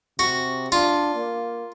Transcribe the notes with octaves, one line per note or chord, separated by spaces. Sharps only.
C3 F#4
D4 F4
A#3